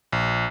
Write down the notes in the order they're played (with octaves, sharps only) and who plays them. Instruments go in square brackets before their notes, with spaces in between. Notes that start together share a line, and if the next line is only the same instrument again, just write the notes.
[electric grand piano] A#1